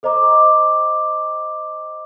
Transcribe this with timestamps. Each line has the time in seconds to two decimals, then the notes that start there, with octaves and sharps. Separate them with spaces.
0.03 A4 C5 D#5 A#5 D6